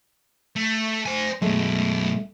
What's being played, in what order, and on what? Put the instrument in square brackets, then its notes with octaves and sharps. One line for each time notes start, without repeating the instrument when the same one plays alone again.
[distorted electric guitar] A3
C5 G#5
[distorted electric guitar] F#2 B2 [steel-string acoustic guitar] G#3 A3